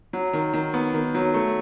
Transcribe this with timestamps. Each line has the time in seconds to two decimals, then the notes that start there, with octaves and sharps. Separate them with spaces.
0.13 F#3
0.33 D#3
0.54 D#3
0.74 B3
0.94 D#3
1.15 F#3
1.34 A3